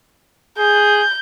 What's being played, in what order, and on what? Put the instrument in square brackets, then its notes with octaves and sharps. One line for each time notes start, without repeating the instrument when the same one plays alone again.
[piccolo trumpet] G#4 [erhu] G6